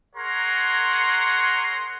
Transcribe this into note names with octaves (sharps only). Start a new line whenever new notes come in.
G#4 A#4 C#5 F#5 A#5 C6